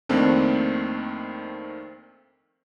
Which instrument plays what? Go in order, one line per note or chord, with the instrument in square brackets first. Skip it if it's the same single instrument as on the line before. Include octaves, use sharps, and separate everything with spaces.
[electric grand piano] F2 D#3 A3 A#3 C4 D4